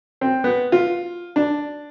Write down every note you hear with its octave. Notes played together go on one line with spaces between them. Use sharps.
C4
B3
F4
D4